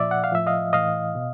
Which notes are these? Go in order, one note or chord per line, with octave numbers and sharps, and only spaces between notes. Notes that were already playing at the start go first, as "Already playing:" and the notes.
Already playing: A#2 F3 D5 E5
F#5
F5
A2 F3 E5
D#5 F5
A2 E3 D#5 F5
B2